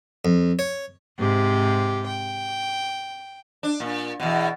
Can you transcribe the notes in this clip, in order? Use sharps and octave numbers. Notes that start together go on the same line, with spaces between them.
F2
C#5
G#2 C3 G4
G5
D4
A#2
E2 B2